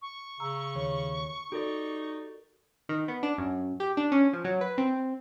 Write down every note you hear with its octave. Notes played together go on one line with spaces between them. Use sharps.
C#6
C#3 A#5 E6
D#2 C#5
D#4 F#4 G4 A4 A#4 D5
D#3
B3
D4
F#2
G4
D4
C#4
F3
F#3
B4
C4